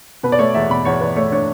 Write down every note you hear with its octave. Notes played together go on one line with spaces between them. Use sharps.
B2 B4
D5
A3 C#5
E2 E5
B2 B5
E2 C#5
E2 B4
A3 C#5
D4 C#5